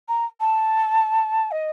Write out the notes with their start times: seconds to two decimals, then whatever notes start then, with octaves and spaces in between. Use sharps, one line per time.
0.08 A#5
0.40 A5
1.51 D#5